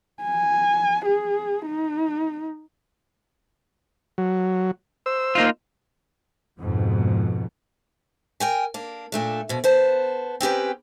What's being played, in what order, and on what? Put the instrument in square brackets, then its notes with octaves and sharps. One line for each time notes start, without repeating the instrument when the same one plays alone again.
[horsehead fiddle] G#5
G#4
D#4
[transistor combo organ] F#3
C5 E6
[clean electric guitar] A#3 D#4 F4
[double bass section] F2 G#2 B2
[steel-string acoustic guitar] A#4 G5 G#5
A#3 D4
A#2 A3 D4
F2 B2
B3 C5 A5
C4 C#4 G4 B4